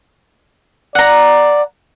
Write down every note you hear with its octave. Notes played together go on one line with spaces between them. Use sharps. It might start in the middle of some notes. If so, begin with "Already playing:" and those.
D5 F#5 A#5